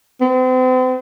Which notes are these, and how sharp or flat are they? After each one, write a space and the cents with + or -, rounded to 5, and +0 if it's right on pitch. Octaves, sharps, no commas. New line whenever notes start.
C4 -40